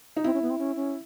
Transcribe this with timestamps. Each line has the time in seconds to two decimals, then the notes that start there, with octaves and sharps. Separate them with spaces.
0.17 D#4
0.24 C4 E4
0.34 C#4
0.42 B3
0.50 C4
0.59 C#4
0.76 C#4